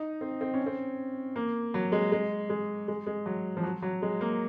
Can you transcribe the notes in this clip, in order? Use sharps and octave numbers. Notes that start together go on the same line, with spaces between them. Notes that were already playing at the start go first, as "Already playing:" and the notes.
Already playing: D#4
C4
C4
C#4
C4
A#3
F#3
G#3
G#3
G#3
G#3
G#3
F#3
F3
F#3
F#3
G#3
A#3